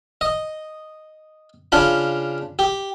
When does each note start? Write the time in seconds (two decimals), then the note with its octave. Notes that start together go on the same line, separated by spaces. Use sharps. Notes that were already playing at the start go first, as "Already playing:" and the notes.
0.21 D#5
1.72 C#3 D4 F4 B5
2.59 G4